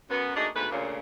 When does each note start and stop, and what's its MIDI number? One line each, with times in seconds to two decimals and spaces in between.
0.10 0.34 42
0.10 0.34 59
0.36 0.47 57
0.36 0.47 58
0.36 0.47 62
0.36 0.47 63
0.36 0.47 66
0.36 0.47 68
0.55 0.68 38
0.55 0.68 44
0.55 0.68 47
0.55 0.68 57
0.55 0.68 71
0.71 0.99 38
0.71 0.99 46
0.71 0.99 49